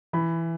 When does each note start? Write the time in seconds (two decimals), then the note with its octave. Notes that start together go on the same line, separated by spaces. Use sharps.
0.13 E3 B5